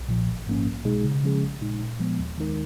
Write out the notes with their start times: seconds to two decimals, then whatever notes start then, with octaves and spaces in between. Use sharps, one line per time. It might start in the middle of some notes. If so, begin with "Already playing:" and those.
Already playing: B1
0.08 A#2 F3
0.28 G#1
0.46 G#2 F3 A#3 C#4
0.66 B1
0.85 B2 G#3 D#4 G#4
1.04 C#3
1.23 F3 G#3 C#4 G#4
1.42 A#1
1.61 A#2 G#3 D#4
1.81 A#2
2.00 F3 G#3 B3
2.19 D#2
2.38 D#3 G#3 D#4 A#4